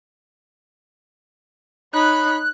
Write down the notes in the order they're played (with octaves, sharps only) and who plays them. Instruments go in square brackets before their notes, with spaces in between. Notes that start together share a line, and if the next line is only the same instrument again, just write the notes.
[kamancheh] D#4 C#5 [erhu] B5 [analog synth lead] F#6